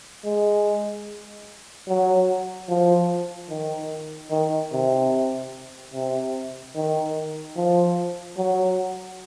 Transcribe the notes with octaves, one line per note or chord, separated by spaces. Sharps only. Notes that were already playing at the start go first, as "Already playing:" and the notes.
G#3
F#3
F3
D#3
D#3
C3
C3
D#3
F3
F#3